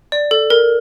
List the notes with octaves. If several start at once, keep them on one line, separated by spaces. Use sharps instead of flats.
D5
A4
A#4